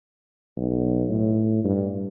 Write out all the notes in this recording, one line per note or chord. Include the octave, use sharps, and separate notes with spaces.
B1
A2
G2